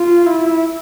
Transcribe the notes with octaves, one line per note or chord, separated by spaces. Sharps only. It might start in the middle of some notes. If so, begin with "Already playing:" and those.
Already playing: F4
E4